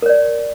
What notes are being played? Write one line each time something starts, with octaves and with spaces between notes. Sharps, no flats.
A#4 C#5 D5